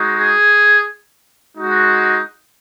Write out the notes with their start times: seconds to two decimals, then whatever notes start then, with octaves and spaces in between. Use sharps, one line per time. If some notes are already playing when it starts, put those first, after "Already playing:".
Already playing: G#3 D#4 F#4
0.16 G#4
1.55 G#3 D#4 F#4